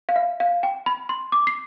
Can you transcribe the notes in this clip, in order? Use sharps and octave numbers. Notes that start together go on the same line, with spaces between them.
F5
E5
F5
G5
B5
C6
D6
C7